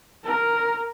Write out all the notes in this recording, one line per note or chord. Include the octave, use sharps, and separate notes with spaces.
A#4